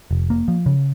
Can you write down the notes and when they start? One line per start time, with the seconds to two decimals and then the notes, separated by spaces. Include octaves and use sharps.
0.11 F1
0.30 A#3
0.48 F3
0.66 C#3